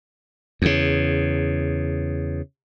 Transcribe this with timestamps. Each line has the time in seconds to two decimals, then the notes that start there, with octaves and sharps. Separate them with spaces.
0.62 E2 C#3